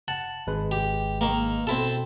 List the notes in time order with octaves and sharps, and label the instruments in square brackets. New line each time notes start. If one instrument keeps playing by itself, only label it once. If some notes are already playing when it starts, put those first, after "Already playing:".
[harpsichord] F#5 [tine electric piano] A5
[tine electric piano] G#1 G#3 B4
[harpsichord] G4
D#3 A#3
[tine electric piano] B2 [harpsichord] C4 E4 A4